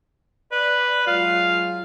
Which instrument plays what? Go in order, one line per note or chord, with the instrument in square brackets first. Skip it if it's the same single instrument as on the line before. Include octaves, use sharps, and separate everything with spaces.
[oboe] B4 [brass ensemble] D5
[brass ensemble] F#3 G#3 F4 [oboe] F5